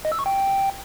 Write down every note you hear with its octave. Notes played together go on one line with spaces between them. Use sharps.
D#5
E6
C#6
G5